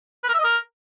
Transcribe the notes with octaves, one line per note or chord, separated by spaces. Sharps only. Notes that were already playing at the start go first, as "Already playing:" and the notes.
B4
A#4
E5
D#5
A#4